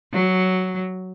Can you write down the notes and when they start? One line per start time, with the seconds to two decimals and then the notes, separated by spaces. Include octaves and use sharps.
0.13 F#3